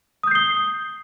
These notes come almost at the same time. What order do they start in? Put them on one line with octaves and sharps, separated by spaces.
D#6 G6 C7 G7